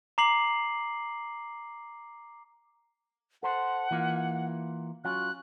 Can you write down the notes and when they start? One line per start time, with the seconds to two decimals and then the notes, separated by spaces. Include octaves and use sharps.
0.18 A#5 D6 C7 F#7
3.43 A4 C5 F#5
3.91 E3 A#3 F4
5.04 F#3 C#4 F4 F#6